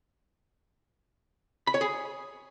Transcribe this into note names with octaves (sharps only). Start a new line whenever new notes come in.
B5
C#5
G#4